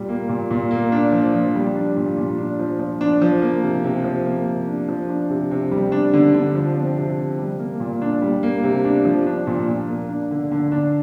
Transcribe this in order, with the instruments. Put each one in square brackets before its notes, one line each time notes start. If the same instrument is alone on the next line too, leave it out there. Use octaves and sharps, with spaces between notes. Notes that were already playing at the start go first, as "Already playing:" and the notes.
Already playing: [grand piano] A#2 G3
A#3
A#2
A#2
A#3
D4
F3
F3
G3
D4
A#2
A#2
D4
F3
F3
D4
F3
A#3
C3
C3
F3
A#3
C3
D4
F3
D4
C3
C3
G3
D4
D3
D3
F3
C4
C3
C3
G3
A#3
A#2
D4
G3
A#3
C3
D4
F3
D4
A#2
A#2
A#3
D4
D3
D3
D4